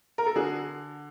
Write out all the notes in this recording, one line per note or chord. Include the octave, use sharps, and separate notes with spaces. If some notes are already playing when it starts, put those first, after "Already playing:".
A#4
A4
D3 F#4 G#4